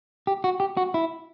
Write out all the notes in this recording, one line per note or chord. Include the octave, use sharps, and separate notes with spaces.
G4
F#4
G4
F#4
E4